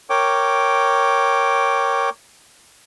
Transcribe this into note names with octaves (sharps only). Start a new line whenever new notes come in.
A#4 C#5 G5 D6